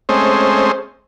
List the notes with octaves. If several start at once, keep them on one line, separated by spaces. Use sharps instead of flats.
G#3 A3 C4 C#4 C5 D#5